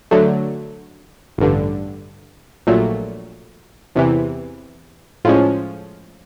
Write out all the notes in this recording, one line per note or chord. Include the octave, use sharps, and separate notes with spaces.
D3 F#3 A3
A1 G2 D3
A#1 A#2 F#3 A3
E2 C3 E3
A2 F3 G#3 C#4